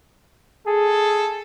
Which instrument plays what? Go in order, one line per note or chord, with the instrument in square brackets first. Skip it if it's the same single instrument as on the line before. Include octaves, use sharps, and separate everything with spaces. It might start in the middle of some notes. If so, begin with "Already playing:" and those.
[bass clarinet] G#4 [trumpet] A4